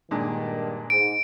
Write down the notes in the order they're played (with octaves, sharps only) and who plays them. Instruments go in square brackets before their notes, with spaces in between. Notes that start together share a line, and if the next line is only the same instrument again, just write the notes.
[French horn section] G2 D#3 [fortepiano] A#2 G#3 D4
[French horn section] G#2 [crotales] D7